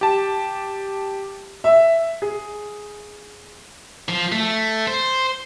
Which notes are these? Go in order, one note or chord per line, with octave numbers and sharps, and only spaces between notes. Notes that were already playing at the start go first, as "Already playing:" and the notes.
G4 A5
E5
G#4
F3
A3
C5